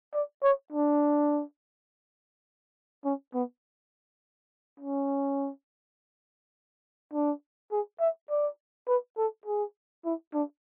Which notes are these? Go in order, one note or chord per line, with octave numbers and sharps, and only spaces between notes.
D5
C#5
D4
C#4
B3
C#4
D4
G#4
E5
D5
B4
A4
G#4
E4
D4